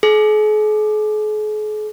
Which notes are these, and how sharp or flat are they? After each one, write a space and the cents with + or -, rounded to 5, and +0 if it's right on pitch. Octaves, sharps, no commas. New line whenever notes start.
G#4 +45